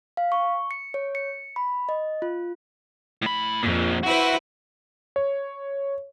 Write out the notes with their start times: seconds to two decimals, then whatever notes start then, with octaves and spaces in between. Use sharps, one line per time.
0.17 F5
0.32 C#6
0.71 C#7
0.94 C#5
1.15 C#7
1.56 B5
1.89 D#5
2.22 F4
3.22 A2 B5
3.63 F2 A#2 F3
4.03 E4 F#4 B4 C5
5.16 C#5